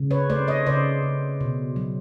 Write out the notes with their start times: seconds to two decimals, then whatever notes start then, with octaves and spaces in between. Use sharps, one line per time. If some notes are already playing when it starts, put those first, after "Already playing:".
Already playing: C#3
0.11 B4 C#5
0.30 A3 C5 D5
0.47 C#5 D#5
0.66 C#3 C5 D5
1.03 C#3
1.41 B2
1.76 F#3